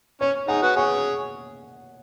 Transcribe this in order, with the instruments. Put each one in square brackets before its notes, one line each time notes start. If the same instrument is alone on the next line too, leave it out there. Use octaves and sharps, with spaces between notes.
[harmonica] C#4 [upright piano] C#5
[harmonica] D#4 G#4 [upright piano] F#5
[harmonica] F#4 B4
[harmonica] G#4 C#5 [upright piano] F#5